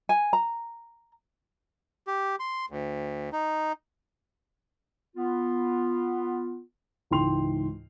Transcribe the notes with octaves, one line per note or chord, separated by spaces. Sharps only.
G#5
A#5
G4
C6
D2
D#4
B3 F4
C#2 G#2 E3 G5 C6 F7